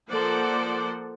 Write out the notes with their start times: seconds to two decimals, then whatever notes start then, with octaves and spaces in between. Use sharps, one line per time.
0.10 F3 A#3 A4 C5 D5 F#5